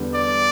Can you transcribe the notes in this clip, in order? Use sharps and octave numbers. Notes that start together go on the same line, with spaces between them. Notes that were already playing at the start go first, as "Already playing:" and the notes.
Already playing: E2 D3 G3 B3
D5